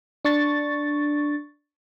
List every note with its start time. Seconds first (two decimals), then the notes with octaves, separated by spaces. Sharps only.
0.25 D4 C#6 A6